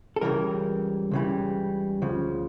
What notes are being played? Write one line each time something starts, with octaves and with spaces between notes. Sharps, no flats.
A4
C#2 C#3 E3 G3 A#4
C#2 C#3 E3 G3
D2 C#3 F3